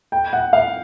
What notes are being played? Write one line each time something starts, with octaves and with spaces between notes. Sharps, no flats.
G5
F#5
F5